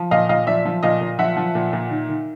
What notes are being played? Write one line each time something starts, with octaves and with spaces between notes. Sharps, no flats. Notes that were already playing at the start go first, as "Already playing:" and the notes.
Already playing: F3
A#2 D#5 F5
A#2 D#5 F5
F3 D5 E5
F3
A#2 D#5 F5
A#2
F3 E5 F#5
F3
A#2
A#2
D#3
D#3